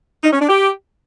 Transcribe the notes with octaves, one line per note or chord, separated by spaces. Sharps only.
D#4
C#4
D4
G4